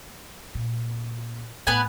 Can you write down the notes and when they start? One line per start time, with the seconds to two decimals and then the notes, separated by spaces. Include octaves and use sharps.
0.55 A#2
1.67 A2 B3 B4 G#5